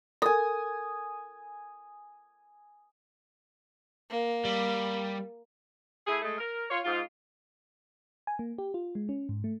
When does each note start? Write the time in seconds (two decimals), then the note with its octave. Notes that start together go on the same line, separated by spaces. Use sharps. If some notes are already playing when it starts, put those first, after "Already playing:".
0.22 A4 A#4 G#5 D#6
4.11 A#3
4.45 G3
6.07 A3 E4 G#4
6.22 G#3 A3
6.38 A#4
6.70 F4 C#5
6.84 G#2 F4
8.27 G#5
8.39 A#3
8.58 G4
8.74 F4
8.95 G#3
9.09 C#4
9.29 G#2
9.44 A3